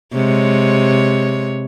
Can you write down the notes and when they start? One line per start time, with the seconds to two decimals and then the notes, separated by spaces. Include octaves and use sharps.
0.13 C3 G#3 C#5